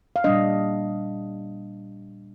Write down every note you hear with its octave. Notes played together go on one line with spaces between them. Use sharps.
F5
A#2 G3 D4 D#5